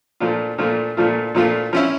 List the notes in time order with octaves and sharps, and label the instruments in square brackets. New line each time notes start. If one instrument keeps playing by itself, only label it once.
[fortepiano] A#2 F3 A3 D4 F4
A#2 F3 A3 D4 F4
A#2 F3 A3 D4 F4
A#2 F3 A3 D4 F4
F3 C#4 E4